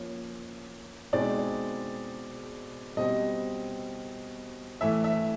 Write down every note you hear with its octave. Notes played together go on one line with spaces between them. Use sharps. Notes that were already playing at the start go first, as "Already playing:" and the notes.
Already playing: F3 A#3 C#4
B2 G#3 C4 D#4 D5
B2 G3 C4 D#5
A2 E3 A3 E5
E5